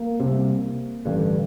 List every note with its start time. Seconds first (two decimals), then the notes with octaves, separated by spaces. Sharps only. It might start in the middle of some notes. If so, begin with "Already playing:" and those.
Already playing: A#3
0.20 C2 C3
1.05 A1 G2 D3